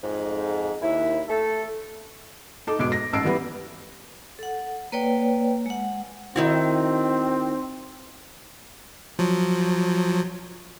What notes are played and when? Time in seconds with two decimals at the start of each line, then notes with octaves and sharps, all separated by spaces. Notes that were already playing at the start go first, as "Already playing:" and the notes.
0.03 F2 G#2
0.82 D#2 E4
1.28 A3 A4
2.67 D#4 A4 D6
2.79 E1 G#2 B2 D6 D7
2.92 A#6
3.13 A1 G#2 A5 E6 C7 D7
3.24 E3 G3 B3 B4
4.39 A4 F#5
4.92 A#3 B4 C#5 D5 G5
5.66 G#3 F#5
6.36 D#3 C4 E4 F#4
9.19 F3 F#3